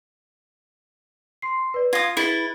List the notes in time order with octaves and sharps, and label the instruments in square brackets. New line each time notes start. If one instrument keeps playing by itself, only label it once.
[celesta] C6 C7
B4 D5
[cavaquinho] F4 D#6 [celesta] G#6 A#6
[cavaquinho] E4 B4 [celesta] G#4 A6 G7